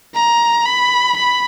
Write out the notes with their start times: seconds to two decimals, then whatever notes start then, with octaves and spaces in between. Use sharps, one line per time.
0.15 A#5
0.66 B5
1.16 B5